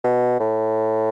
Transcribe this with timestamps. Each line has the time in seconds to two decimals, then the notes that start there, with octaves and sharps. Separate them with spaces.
0.04 B2
0.40 A2